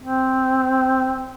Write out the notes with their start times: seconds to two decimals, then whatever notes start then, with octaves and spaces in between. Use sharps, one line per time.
0.01 C4